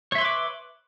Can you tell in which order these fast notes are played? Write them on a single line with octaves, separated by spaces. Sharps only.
C#5 E5 C6 B4 D6